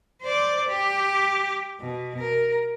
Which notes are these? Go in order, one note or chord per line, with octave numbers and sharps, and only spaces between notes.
C5 D5
G4
B2
A#4